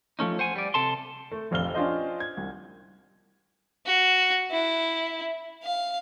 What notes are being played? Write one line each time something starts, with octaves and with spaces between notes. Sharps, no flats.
F3 A3 C#4 D#4
C5 F#5 G#5
G3 D5
C3 A4 A5 C6
A3
F1 A#1 F2 F5 F6 G7
C#4 D4 F4 G4 C5 D#5
G#6
C2
F#4
E4
F5